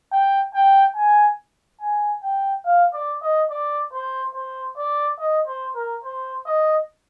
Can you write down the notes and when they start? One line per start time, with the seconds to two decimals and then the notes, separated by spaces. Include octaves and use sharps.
0.12 G5
0.54 G5
0.96 G#5
1.81 G#5
2.23 G5
2.65 F5
2.93 D5
3.22 D#5
3.50 D5
3.93 C5
4.34 C5
4.77 D5
5.19 D#5
5.47 C5
5.75 A#4
6.04 C5
6.46 D#5